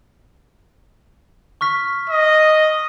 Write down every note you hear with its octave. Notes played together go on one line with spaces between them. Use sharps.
C#6 F6 B6
D#5